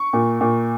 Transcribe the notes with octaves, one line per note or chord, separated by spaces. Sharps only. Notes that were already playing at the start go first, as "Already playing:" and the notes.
Already playing: C#6
A#2
A#2